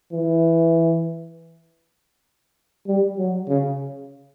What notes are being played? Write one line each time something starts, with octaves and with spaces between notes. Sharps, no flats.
E3
G3
F#3
C#3